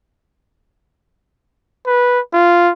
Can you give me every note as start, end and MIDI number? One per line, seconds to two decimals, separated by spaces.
1.86 2.20 71
2.33 2.72 65